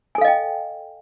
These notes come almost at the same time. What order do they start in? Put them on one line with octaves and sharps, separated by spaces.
G#5 A4 F5 D#5 G5